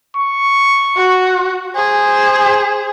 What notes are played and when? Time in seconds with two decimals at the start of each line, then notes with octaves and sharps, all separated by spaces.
0.16 C#6
0.97 F#4
1.76 G#4 C5